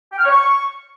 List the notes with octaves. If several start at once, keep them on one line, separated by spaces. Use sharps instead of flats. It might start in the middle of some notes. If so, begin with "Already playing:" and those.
G5
F6
C#5
C#6